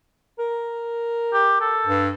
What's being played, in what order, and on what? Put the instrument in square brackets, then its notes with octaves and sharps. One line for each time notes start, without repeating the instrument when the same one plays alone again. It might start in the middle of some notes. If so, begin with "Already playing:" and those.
[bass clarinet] A#4
[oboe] G4
A4
[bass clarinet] G2